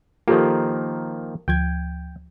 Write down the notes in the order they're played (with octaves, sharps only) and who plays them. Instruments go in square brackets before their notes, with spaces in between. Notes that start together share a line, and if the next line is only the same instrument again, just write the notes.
[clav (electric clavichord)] D#3 F3 A#3 [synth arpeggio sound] F4 G4 A4
[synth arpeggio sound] D2 F3 G#6 [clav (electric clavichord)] G5